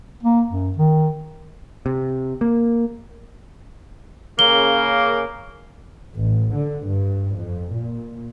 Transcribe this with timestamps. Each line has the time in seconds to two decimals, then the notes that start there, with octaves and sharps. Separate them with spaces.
0.23 A#3
0.48 F#2
0.77 D#3
1.86 C3
2.41 A#3
4.39 C#3 A#3 G7
6.16 A1
6.57 D3
6.88 G2
7.38 F2
7.74 A#2